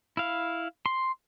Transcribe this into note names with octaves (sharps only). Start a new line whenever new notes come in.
E4 F5
C6